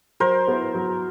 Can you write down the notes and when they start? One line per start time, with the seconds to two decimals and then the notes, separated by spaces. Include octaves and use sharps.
0.20 F#3 A#4 C5
0.48 B3 E4
0.74 F#3